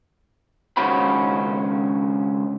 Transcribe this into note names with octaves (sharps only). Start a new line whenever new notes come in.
C#2 D#3 C#4 F#4 C5 B5